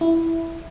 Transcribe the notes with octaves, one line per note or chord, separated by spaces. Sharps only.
E4